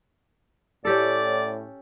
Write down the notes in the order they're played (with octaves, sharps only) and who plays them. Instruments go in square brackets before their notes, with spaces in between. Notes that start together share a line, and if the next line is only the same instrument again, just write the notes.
[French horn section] A2 [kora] C#4 G4 A4 [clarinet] D5